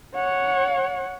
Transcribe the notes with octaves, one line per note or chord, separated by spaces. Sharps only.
C#5 F#5